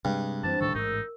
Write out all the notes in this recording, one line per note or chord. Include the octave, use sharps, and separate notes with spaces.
G2 C3 G#3
F#2 E3 C4 D4 C5 A5
D2 A2 D#3 A4 C#6
A1 G#2 D#4 A#4 E6